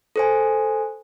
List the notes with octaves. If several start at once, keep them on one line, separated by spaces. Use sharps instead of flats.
A4 C5 G#5